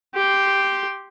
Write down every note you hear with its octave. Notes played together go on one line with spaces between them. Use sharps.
G4 C6